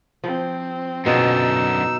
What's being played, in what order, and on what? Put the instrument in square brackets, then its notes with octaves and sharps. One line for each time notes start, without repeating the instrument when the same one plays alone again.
[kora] F3 [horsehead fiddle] C4
[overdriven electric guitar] F#2 D3 [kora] B2 F4 G#4 [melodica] D#4 E6